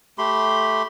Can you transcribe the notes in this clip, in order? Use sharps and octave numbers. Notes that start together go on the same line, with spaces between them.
A3 G4 B5 C6